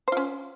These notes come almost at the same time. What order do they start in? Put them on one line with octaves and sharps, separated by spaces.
C5 F4 C#4